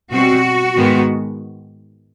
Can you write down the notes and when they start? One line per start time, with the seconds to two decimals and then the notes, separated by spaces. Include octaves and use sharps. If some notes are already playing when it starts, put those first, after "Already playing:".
0.11 B2 G3 C4 F#4
0.75 G#2 D#3 G#3 B3